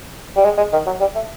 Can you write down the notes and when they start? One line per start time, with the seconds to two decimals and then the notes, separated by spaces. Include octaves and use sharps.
0.36 G3
0.44 G#3
0.58 G#3
0.73 D#3
0.86 F#3
1.00 G3
1.15 A3